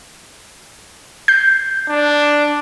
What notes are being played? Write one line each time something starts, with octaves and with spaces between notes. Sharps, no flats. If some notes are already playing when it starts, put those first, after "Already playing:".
G6 C7
D4